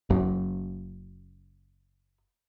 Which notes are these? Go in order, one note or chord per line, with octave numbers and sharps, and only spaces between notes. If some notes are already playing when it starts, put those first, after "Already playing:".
F#1 F#2